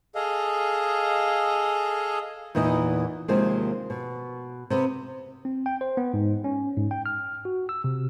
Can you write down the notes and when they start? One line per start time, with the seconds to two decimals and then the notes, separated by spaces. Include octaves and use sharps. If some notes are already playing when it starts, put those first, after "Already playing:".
0.15 G#4 A4 D#5 F5
2.55 E2 A#2 E3 D#4 D#5
3.28 D#2 C3 F3 G#3 A#3 C4
3.90 B2
4.70 C3 B3
5.45 C4
5.66 G5
5.81 C5
5.97 B3
6.14 G#2
6.44 C#4
6.77 G#2
6.91 G5
7.06 F6
7.45 F#4
7.69 E6
7.84 C3